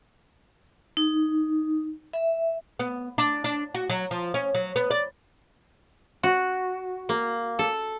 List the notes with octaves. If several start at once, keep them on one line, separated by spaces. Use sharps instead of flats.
D#4
E5
B3
D4
D4
F#4
F#3
F3
C#4
F#3
B3
D5
F#4
A#3
A4